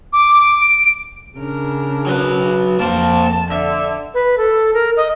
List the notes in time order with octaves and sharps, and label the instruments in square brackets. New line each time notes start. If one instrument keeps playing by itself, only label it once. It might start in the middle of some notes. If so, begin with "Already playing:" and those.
[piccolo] D6
D7
[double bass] C#3 D4 [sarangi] A#4
[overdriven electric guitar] F#3 B4
[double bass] F2 [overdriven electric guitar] A#3 C5 [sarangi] A5
[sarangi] D3 [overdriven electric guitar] E5
[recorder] B4
A4
A#4
D#5